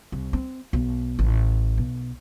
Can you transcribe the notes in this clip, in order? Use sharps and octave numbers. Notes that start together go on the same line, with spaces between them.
C2
C4
B1
A1
B1